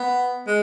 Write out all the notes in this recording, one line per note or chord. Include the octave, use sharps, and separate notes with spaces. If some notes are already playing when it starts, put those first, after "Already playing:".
Already playing: B3
G#3